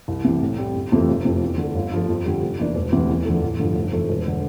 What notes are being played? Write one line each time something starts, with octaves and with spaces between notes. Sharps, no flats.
C2
C3 E3
A2
G3 C4
G1
F2 C3 E3 A3
F1
F2 C3
E2
D3 A3
G1
G2 F3 A3
F2
D3 G3
F1
E2 E3 A#3 D4
E1
D2 C3 E3
E2
D3 F3 A3
A1
G2 D3 F3 A3
F1
F2 E3 A3
E1
D3